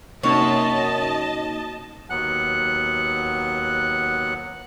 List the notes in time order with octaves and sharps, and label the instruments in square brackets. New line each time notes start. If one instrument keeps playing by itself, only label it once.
[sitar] F#2 [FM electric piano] C3 A#3 D#4 [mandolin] C#5 [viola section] D#5 A5
[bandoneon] D#2 F#3 B3 F#5 F#6